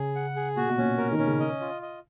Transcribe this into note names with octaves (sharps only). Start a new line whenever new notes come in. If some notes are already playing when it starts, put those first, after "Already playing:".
Already playing: C#3 G#4
F#5
G#4
A#2 F#4
B2
A#2 C#4
A#4
D#3
C#4
C#3
D#5
F4
D#5